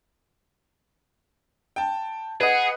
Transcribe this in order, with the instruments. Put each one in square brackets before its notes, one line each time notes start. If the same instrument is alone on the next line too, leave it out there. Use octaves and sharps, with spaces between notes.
[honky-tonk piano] G5 A5
[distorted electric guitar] G#4 [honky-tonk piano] B4 D#5 [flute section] F#5